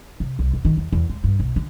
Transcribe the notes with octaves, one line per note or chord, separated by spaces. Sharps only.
C3
C2
E2
D#3
E2
E2
G#3
G2
B1
D3